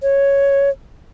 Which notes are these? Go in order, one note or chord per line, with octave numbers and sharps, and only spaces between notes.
C#5